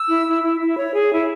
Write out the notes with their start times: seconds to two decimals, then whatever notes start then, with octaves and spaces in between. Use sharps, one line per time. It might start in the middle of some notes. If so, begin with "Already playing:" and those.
Already playing: E6
0.09 E4
0.26 E4
0.43 E4
0.60 E4
0.77 C#5
0.94 G#4
1.11 E4